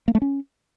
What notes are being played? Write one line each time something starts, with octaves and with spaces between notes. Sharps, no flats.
A#3
A3
C#4